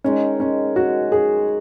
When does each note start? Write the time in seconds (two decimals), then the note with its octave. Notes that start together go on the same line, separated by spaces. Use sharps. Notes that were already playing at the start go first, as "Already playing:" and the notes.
0.04 D#3 G#3 C#4 D#4
0.40 C#4
0.76 F#4
1.12 G#4